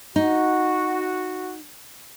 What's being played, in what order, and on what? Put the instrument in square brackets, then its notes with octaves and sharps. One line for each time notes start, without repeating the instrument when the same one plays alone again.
[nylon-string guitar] D#4 [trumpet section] F#4